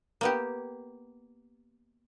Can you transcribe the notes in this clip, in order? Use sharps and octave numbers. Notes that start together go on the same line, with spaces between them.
A#3 B3 G4